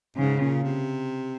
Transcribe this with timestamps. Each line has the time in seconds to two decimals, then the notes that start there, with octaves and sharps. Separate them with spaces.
0.17 G#2 C#3
0.40 A#2
0.64 C3